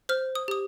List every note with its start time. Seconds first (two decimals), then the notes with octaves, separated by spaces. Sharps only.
0.09 C5 F6
0.35 D#6
0.48 G4 D#6